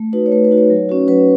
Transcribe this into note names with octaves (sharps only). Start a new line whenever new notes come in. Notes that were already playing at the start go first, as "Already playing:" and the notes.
Already playing: A3
D#4 F#4 B4
C#5
A3 B4
B4
D#4 F#4
C#5
F#3
C#4 F#4
F#3 B4